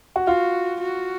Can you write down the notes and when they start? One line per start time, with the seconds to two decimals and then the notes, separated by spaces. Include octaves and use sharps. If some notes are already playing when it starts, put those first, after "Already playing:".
0.16 F#4
0.27 F4 F#4
0.81 F#4